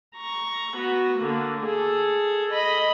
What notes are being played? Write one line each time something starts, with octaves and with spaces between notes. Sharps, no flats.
A#5 C#6
B3 F#4
D3 A#3
G#4 A4
D#5 B5